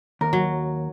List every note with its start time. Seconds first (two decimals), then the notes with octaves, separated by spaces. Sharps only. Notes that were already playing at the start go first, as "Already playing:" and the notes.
0.21 D#2 A#4
0.33 F#3